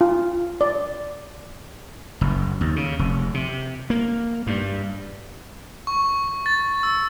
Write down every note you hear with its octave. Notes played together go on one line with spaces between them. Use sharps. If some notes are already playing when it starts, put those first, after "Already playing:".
F4
D5
F#1
D#2
C#3
F1
C3
A#3
G2
C#6
A6
E6